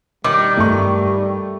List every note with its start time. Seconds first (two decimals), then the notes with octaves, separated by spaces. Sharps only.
0.24 B2 D#3 G3 D6
0.57 G2 A3 B3 C#6